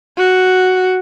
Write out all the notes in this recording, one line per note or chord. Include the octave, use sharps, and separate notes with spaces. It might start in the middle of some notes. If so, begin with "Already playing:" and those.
F#4